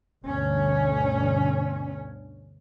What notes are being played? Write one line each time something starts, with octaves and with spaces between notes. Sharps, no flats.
D2 G2 B2 C#4